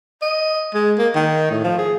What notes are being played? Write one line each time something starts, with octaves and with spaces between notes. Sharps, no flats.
D#5
G#3
A#3
D#3
A2
F3
G#4